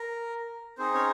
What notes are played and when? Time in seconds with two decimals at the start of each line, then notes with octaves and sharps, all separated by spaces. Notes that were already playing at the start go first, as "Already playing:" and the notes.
Already playing: A#4
0.78 C4 D#4 G#4 C5
0.94 C#4 C#5